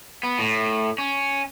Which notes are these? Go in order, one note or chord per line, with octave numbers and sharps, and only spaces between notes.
B3
A2
C#4